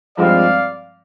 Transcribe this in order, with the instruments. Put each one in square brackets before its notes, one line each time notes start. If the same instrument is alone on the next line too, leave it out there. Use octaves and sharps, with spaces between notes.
[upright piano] G2 F3 G#3 C4 [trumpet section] D5 F5